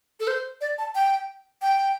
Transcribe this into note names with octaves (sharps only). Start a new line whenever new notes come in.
A4
C5
D5
A5
G5
G5